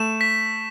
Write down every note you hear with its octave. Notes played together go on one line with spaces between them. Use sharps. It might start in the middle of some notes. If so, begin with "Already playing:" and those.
Already playing: A3 E7
B6